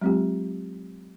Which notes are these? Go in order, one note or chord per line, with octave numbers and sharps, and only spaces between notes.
F#3 G#3 C4 F4 G4